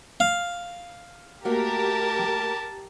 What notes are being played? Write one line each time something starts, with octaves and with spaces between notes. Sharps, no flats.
F5
A3 A#3 F#4 G4 A#4 A5